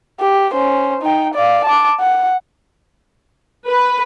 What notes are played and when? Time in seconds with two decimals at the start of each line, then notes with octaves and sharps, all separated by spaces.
0.20 G4
0.53 C#4 C5
1.02 D#4 G5
1.34 D5 F5
1.65 A5 D6
2.00 F#5
3.67 B4